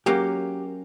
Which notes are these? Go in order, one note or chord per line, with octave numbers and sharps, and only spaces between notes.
F#3 A#3 C#4 G4